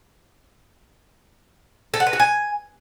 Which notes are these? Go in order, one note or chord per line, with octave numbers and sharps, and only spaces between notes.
A4
F#5
B4
F#4
G#5